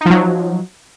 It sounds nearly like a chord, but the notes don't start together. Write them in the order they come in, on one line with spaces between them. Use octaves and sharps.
D#4 F3 F#3